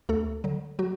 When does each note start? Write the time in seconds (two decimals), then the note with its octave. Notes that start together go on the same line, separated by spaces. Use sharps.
0.09 D2 A3 A4
0.44 D3 F#3
0.79 F#3 F#4